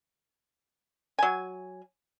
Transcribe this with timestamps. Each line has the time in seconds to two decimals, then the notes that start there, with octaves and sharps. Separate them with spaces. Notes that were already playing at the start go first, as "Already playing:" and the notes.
1.19 F#3 G#5